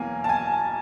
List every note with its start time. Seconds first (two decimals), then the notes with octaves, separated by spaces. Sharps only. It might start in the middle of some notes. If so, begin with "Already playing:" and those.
Already playing: E2 B2 F#3 A#3 G#5
0.24 A5
0.29 G#5